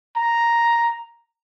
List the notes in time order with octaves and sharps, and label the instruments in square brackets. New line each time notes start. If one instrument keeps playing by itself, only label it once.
[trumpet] A#5